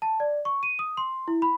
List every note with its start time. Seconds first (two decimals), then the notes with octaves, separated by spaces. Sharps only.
0.02 A5
0.20 D5
0.45 C#6
0.63 D#7
0.79 D#6
0.97 C6
1.28 E4
1.42 B5